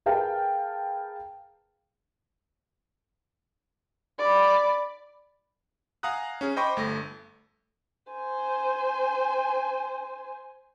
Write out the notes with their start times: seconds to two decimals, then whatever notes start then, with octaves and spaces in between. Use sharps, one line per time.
0.06 G#4 A#4 B4 F5 G5 A5
4.19 D5 B5
6.03 F5 F#5 G#5 A#5 D#6 F#6
6.41 C#4 G#4
6.56 C5 D#5 G5 B5 C#6 D6
6.77 G1 A3 A#6
8.12 C5 G#5